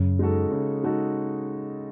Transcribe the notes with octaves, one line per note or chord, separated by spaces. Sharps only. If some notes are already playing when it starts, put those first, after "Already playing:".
Already playing: F#2 C#3
G#3 D#4 F#4 A4
C#3
G#3 D#4 F#4 A4